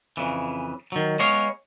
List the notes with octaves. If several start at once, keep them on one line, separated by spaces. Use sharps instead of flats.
F2 C#3 E3
D#3 F#3
G#3 B3 C#5 F5